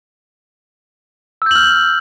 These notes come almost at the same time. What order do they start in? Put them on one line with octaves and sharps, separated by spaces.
E6 G6 F#7 F6